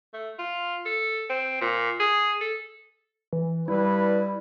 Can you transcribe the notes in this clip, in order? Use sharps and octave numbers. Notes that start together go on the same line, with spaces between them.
A3
F4
A4
C4
A#2
G#4
A4
E3
G2 G3 E4 B4